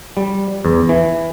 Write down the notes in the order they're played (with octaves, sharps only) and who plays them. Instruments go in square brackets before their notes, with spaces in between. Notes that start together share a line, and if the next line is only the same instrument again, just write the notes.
[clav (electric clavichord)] G3
E2
E3